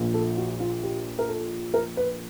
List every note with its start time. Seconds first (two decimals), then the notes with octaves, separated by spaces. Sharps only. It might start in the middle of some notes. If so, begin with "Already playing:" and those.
Already playing: A#1 A#2
0.14 A4
0.37 F#4
0.60 F4
0.83 G4
1.19 A#4
1.28 A4
1.74 A#4
1.97 B4